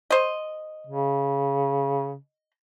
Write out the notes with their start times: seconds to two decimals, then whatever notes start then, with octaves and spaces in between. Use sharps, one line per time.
0.10 C5 D#5
0.87 C#3